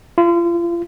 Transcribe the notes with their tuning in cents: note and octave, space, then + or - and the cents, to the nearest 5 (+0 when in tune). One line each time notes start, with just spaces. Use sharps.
F4 -35